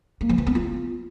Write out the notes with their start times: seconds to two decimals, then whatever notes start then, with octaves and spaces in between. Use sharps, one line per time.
0.21 A#3
0.29 F3
0.38 E3
0.47 B3
0.55 F4